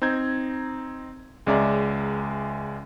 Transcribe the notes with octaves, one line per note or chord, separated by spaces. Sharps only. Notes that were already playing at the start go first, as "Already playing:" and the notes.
C4 D#4 A#5 G6 G#6
C#2 G#3 C#4 D5 E5 A#5